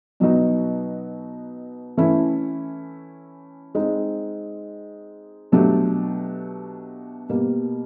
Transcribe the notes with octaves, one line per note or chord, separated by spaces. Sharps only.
B2 F#3 B3 D#4 F#4
E3 A3 C#4 E4
G#3 C4 D#4
B2 F#3 A3 D4 G4
B2 G3 A#3